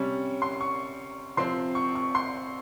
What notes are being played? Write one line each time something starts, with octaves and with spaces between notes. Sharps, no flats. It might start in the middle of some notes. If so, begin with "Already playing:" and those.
Already playing: C3 G3 C#4 C#6
C6
C#6
C3 F3 C4 C6
C#6
C#6
C6